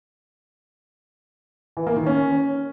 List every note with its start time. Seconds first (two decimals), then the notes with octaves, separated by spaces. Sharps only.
1.77 E3
1.87 A#3
1.97 D#3
2.06 C#4